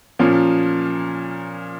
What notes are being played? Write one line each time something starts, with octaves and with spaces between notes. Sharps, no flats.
A#2 F3 A#3 C#4